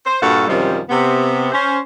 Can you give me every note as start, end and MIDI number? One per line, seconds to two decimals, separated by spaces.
0.06 0.19 72
0.21 0.44 43
0.21 0.44 46
0.21 0.44 66
0.21 0.44 69
0.21 0.44 77
0.21 0.44 78
0.47 0.79 42
0.47 0.79 48
0.47 0.79 51
0.47 0.79 53
0.47 0.79 55
0.47 0.79 60
0.89 1.48 48
0.89 1.48 59
1.52 1.78 61
1.52 1.78 72